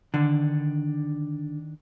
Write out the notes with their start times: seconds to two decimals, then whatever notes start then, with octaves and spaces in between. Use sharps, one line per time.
0.14 D3 D#3 D4 D5